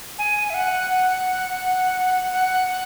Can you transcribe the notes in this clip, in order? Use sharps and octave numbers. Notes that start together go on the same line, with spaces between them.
G#5
E5
F#5
F#5
F#5
F#5